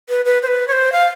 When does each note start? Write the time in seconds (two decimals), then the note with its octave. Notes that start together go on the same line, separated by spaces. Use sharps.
0.09 B4
0.25 B4
0.42 C5
0.47 B4
0.68 C#5
0.72 C5
0.92 F5